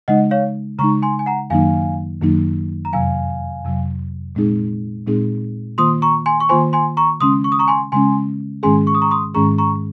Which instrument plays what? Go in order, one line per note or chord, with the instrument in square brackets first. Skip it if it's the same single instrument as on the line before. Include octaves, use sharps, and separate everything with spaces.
[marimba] C#3 G#3 D#4 [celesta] D#5 F#5
[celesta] C#5 F5
[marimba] C#3 G#3 D#4 [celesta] A#5 C#6
[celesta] G#5 C6
G#5
F#5 A#5
[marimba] F#2 D#3 F#3 A#3 D#4 [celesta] F5 G#5
[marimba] F#2 D#3 F#3 A#3 D#4
[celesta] A#5
[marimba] F2 C3 F#3 [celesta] F5 G#5
[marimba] F2 C3 F#3
A#2 G#3 C4 D#4 G#4
A#2 G#3 C4 D#4 G#4
[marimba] D#3 A#3 F4 C5 [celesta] C6 D#6
[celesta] A#5 C#6
G#5 C6
C#6
[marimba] D#3 A#3 F4 C5 [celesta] G#5 C6
[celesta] G#5 C6
A#5 C#6
[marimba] C#3 G#3 C#4 [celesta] C6 D#6
[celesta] C#6
D#6
A#5 C#6
G#5 C6
[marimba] C#3 G#3 C#4 [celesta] G#5 C6
[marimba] G#2 D#3 G#3 C#4 G#4 [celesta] G#5 C6
[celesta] C#6
D#6
A#5 C#6
C6 D#6
[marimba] G#2 D#3 G#3 C#4 G#4 [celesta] A#5 C#6
[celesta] A#5 C#6